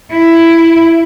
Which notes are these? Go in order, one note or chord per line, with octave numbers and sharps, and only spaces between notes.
E4